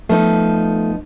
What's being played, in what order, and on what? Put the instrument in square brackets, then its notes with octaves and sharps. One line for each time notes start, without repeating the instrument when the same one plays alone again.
[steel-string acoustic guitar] F3 B3 D#4 [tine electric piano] A3